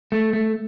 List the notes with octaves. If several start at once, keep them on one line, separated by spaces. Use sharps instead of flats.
A3
A3